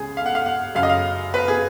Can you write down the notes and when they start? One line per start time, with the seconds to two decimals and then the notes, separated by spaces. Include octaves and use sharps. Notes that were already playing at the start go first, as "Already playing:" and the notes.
Already playing: C#2 C#3 G#4
0.17 F5
0.26 F#5
0.35 F5
0.46 F#5
0.75 F#2 C#3 F5
0.83 D#5
0.89 F5
1.34 B4
1.48 G#4